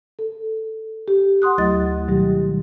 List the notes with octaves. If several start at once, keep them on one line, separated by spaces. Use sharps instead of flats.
A4
G4
F#5 C6 D#6 F#6
D2 F#3 A3 E4 D#5 A6
B2 D#3 F#3 G3 G4